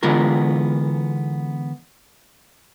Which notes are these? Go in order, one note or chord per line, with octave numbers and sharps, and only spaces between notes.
D3 E3 G#3 B3 F4 A#4